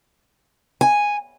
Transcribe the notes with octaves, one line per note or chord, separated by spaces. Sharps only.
G#5